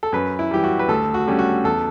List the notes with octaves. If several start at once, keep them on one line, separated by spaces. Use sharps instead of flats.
A4
F#2 B4
E4
E3 G3 G4
F#4
B4
D2 A4
F#4
D3 G3 C#4
F#4
E2 A4